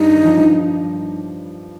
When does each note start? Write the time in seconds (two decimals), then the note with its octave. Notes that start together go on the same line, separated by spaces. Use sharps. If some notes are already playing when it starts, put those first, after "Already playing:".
Already playing: G2 G3 D#4
0.13 D#3
0.25 F3
0.37 G2 G3